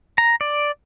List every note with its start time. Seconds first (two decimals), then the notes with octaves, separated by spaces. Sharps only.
0.18 A#5
0.41 D5